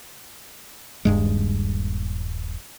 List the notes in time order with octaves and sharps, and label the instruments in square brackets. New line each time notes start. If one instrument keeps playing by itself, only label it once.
[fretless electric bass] D#1 G2 G#3